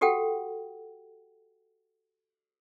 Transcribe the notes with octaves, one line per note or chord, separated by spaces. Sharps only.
F#4 G4 A4 F#5 G5